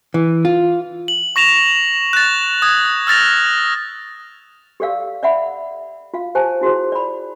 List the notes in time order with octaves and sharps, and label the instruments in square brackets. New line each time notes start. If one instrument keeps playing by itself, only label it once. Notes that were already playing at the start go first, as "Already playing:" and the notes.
[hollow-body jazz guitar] E3
F4
[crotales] F#7
C#6 A#6 E7 F7
F#6 A6
D#6 G#6
E6 F6 A6 A#6 F7
[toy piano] G4 A4 D5 F5 E6
D5 E5 F#5 B5
F4 F5
G4 C5 G#5 A5
E4 F#4 G#4 C5
D5 B5